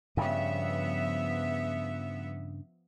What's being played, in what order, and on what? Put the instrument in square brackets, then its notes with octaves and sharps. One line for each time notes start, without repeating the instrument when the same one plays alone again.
[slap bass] G2 C#3 [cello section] F3 B3 E5